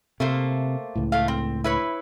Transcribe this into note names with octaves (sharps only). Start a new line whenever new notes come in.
C3 A3 A#3 C5
C#2 A2
A3 F5
C4
E4 B4 C#5